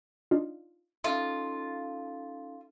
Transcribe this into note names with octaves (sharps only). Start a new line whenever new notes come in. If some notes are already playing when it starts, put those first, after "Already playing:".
D4 D#4 F4
C#4 D#4 F4 A4 E5